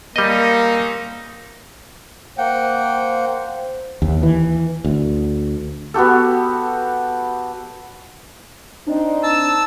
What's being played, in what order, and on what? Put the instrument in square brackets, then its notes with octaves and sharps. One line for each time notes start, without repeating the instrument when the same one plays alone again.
[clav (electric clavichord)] G3 D#5 [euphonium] A#3 [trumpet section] C4 C#4 D#4
[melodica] A#3 F#5 G5 [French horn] C5
[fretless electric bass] D#2
E3
D2
[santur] B3 F#4 G4 A4
[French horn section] C4 D#4 [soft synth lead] D4
[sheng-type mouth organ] A5 E6